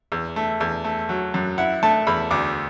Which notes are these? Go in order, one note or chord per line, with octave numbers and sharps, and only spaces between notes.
E2
A3
E2
A3
F#3
F#2
E4 F#5
A3 A5
E2 B5
D2 D6